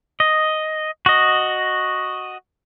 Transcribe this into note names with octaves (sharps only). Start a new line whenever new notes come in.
D#5
F#4 D#5